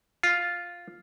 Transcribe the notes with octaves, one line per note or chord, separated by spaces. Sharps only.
F4